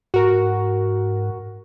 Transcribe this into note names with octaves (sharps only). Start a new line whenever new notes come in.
G#2 F#4 A#4